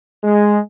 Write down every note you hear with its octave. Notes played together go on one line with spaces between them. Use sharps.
G#3